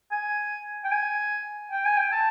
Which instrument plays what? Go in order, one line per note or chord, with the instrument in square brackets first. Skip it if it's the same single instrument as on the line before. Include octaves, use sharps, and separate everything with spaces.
[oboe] G#5
G5
G#5
G5
G#5
G5
A5